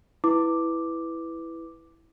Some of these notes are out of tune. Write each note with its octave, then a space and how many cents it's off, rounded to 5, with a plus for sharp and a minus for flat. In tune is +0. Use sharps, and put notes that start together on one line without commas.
E4 +0 B4 +0 D6 +0